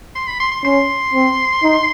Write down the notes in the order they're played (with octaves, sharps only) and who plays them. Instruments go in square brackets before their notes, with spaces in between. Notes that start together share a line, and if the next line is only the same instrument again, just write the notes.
[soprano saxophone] C6
B5
C6
C6
[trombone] C#4 [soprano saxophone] C6
[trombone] C4
D#4